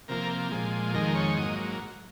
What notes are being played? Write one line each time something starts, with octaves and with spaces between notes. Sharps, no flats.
C3 F3 A#3 A#4
A#2 F3 G#3
F2 D#3 G#3 A#4
C#5
G#2 F#3 A#3 D#5